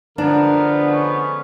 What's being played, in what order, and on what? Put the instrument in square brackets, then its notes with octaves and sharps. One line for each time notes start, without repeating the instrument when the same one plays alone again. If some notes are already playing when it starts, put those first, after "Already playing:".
[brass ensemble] D3 [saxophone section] F3 G#3 B3 [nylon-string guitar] D4 [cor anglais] A#4
[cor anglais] C#4